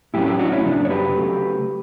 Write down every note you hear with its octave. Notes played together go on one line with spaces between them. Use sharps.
A2 F#3 C#4 E4 G4
E4 G4
D4 F#4
C#4 E4
F#2 C#3 F#3 D4
C#5
G4 B4
C#3 F#3 A3